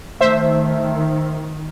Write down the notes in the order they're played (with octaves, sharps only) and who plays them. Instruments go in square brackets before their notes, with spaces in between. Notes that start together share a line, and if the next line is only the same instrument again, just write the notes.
[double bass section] D#3 [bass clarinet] A3 [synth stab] C5 E5